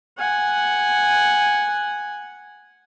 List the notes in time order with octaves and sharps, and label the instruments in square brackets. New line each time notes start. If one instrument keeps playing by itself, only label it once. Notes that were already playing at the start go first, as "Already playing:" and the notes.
[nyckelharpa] F#5 G#5